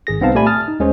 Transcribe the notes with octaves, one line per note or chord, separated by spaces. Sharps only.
G#1 G#4 A#6
C2 B3 C4 D#4 F5 A5
A#2 A3 G4 D5 G#5 B5
A5 D#6 F6 A6
D#4
D#2 G#3 C#4 G#4 C5